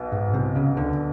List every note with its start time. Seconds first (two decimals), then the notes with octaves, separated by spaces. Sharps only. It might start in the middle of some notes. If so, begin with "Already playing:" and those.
Already playing: B1 B2
0.12 G#2
0.33 C2 C3
0.55 C#2 C#3
0.77 D2 D3